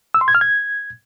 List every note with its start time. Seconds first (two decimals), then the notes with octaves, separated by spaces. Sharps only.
0.14 E6
0.21 C6
0.28 G#6
0.35 F6
0.41 G#6